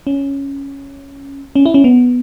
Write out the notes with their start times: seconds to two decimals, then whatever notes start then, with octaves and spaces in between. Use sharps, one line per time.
0.07 C#4
1.55 C#4
1.66 E4
1.74 C#4
1.84 B3